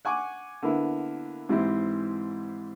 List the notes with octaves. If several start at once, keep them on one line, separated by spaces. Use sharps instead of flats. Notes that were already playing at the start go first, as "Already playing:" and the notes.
F#5 G#5 C#6 D6
D3 A#3 B3 E4
G#2 E3 C4 E4 G4